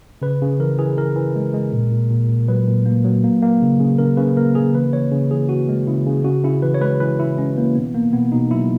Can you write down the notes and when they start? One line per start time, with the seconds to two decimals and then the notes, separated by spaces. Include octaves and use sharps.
0.22 C#3 B4
0.42 C#3
0.60 E3 A#4
0.79 E3 G#4
0.98 E3 A#4
1.16 E3
1.36 G#3
1.54 G#3
1.72 A#2
1.91 A#2
2.10 A#2
2.29 A#2
2.48 F#3 B4
2.68 A#2
2.86 A#3
3.05 F#3
3.24 A#3
3.42 A#3
3.62 C#3
3.80 C#3
3.98 C#3 A#4
4.17 C#3 B4
4.37 A#3 A#4
4.55 C#3 G#4
4.74 E3 B4
4.93 E3 C#5
5.11 C#3
5.31 E3 G#4
5.49 C#3 F#4
5.69 G#3
5.87 C#3 E4
6.07 C#3
6.24 C#3 F#4
6.44 C#3 E4
6.62 E3 B4
6.74 C#5
6.81 G#3 B4
7.00 E3 B4
7.19 E3 E4
7.37 G#3 C#4
7.57 E3 A#3
7.75 B2 B3
7.95 A#3
8.13 B2 B3
8.32 B2 D#4
8.51 F#3 E4